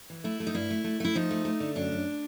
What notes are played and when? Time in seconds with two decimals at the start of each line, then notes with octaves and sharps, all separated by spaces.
0.10 E3
0.24 A3 E4
0.40 A3
0.47 D#4
0.55 G2 E4
0.70 A3
0.84 A3
1.00 A3 E4
1.15 F3 D#4
1.31 A3
1.45 A3
1.60 D3
1.75 F#2 D4
1.91 F#2